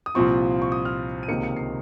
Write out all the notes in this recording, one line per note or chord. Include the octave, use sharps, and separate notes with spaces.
D#6
C2 A#2 F3 C4 F4 C#6
C#6
D#6
F6
D#7
C#2 C3 D#3 A#3 C#7
C#7
C7